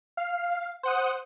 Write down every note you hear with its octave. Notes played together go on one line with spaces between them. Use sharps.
F5
C5 F#5 D#6